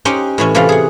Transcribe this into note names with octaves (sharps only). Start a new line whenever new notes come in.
C#4 D#4 G4 C5 F#5 G5
A2 E3 C#4
C3 E3 A3 F4 F5
G#4 F#5